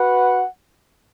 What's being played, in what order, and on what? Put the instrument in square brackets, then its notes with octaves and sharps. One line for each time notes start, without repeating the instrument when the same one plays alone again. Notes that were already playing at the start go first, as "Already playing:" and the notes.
Already playing: [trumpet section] F#4 B4 F#5